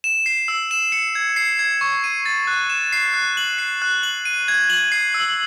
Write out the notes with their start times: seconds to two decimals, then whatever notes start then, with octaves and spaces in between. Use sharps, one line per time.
0.04 E7
0.26 C7
0.48 E6
0.71 E7
0.92 C#7
1.15 G#6
1.36 C7
1.59 G#6
1.81 C#6
2.04 D#7
2.26 A6
2.47 F#6
2.70 E7
2.92 C7
3.14 F#6
3.37 F#7
3.58 C7
3.82 F#6
4.03 F#7
4.25 D#7
4.48 G#6
4.70 F#7
4.92 C7
5.14 E6